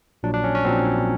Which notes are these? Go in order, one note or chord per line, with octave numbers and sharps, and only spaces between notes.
A#1 A#2 F#3 D4
D4
C#4
C#4
A#1 A#2 F#3 C4